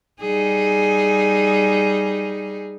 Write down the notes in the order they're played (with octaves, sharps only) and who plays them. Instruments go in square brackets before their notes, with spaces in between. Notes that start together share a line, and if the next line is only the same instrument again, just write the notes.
[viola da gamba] G3 D#4 G#4